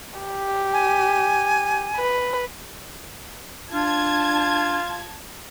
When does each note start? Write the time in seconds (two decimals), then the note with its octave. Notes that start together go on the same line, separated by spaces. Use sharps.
0.19 G4
0.73 G#5
1.96 B4
3.72 D4 F4 A5 G#6